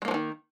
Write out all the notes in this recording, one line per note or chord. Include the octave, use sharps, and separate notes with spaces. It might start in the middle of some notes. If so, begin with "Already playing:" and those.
D#3 F3 F#3 G#3 A#3